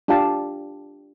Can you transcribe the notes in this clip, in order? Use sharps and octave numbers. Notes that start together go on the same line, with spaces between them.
D4 F4 G4 F5 A5